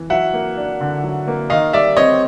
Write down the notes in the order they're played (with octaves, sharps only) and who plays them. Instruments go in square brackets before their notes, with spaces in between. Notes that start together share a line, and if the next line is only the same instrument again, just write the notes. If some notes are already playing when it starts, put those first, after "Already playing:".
Already playing: [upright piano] E3
[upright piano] F#3 [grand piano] E5 F#5
[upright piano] A#3
D4
D3
F#3
A#3
[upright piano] D#3 [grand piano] D#5 F5
[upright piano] G3 [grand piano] D5 E5
[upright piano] C4 [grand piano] C#5 D#5